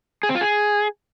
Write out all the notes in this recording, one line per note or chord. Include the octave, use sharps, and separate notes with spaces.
G#4
C4
F4
G#4